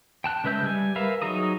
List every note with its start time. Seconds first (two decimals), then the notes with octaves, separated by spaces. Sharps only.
0.24 G5 A5 F#6
0.44 C#3 G#3 B4 E5 G6
0.63 G3 G#5
0.96 A#4 B4 E5 F5
1.22 F#3 D#4 G#4 A#5 D#6